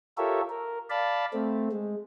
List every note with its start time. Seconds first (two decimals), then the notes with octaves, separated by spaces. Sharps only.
0.18 F4 G4 A4 A#4 C#5 E5
0.50 A#4
0.90 D5 F5 A5 B5
1.33 A3 C4
1.72 G#3